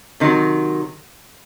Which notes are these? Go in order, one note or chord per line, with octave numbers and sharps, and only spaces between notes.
C3 D#3 F#3